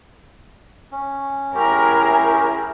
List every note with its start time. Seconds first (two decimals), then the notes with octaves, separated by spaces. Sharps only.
0.92 C#4
1.55 C#4 E4 G4 G#4 A#4